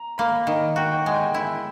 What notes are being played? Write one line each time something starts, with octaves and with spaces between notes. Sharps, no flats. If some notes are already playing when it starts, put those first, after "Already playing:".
Already playing: A#5
A#3 B5
D#3
F#4 G5
G5
G#3 F#5
G5
G#5
E4